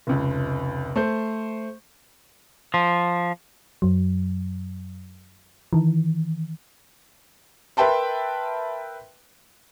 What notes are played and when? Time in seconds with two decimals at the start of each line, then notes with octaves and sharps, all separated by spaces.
0.07 F1 C#2
0.96 A3 C5 G6
2.74 F3
3.82 F#2 F#3
5.73 D#3 E3
7.77 A#4 B4 E5 G5 A5 C6